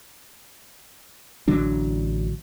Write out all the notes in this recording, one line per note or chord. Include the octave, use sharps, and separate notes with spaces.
A1 D3 F#3 D4